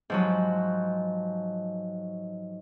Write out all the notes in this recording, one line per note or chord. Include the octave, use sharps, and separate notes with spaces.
G#2 F3 F#3